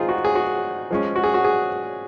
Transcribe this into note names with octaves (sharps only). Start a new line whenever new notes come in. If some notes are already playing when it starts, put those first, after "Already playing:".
Already playing: D#3 G#3 C4 D#4 F4 G#4
F#4
G#4
F#4
F3 G#3 C#4
F#4
G#4
F#4
G#4